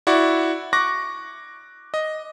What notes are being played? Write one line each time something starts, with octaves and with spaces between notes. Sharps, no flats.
E4 F#4 D5 C#6
C#6 D6 F#6 A#6
D#5